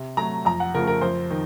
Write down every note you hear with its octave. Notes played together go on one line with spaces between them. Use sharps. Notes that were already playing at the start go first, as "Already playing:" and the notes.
Already playing: C3
F#3 A3 A#5
F2 A#5
F#5
C#3 F3 A3 A#4
A#4
F2 C5
D#3